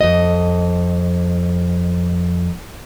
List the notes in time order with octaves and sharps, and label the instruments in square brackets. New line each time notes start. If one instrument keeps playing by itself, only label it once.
[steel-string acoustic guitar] F2 D#5